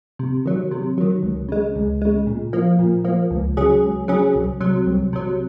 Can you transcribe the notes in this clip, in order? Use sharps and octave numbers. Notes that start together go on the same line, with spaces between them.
C3
D#3 F#3
C3
D#3 F#3
C#2
C#3 G#3
C#2
C#3 G#3
A#2
F3 A#3
A#2
F3 A#3
C#2
C#3 F#3 C#4 G#4
C#2
C#3 F#3 C#4 G#4
C2
C3 F#3
C2
C3 F#3